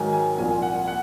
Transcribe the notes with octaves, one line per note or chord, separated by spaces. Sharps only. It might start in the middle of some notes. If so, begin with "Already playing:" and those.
Already playing: G#2 D#3 F#3 G#5
G#5
C2 A#2 F3 G#5
F#5
F#5